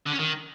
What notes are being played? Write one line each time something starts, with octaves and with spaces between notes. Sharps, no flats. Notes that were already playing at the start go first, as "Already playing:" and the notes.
D3
C#4
D#3